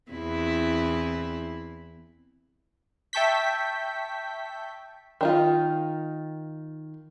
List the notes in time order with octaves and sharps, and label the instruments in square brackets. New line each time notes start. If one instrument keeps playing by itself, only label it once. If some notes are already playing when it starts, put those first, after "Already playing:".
[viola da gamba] E2 C4 E4
[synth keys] E5 G5 A5 C#6 G6 B6
[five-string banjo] D#3 D#4 F4